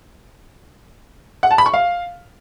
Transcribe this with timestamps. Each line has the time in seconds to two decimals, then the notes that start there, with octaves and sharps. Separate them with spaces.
1.43 F#5
1.51 A5
1.58 B5
1.66 C#6
1.74 F5